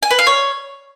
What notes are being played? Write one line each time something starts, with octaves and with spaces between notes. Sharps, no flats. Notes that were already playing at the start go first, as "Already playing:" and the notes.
G#5
B4
F5
C#5